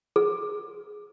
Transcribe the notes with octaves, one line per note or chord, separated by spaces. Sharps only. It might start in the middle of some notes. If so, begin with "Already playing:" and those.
G#4